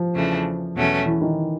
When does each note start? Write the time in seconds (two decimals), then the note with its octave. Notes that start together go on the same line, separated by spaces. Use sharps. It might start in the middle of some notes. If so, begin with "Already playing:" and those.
Already playing: F3
0.13 E2 C#3 E3 A3 D4
0.76 E2 B2 F#3 A3 C#4
1.06 E3
1.22 D#3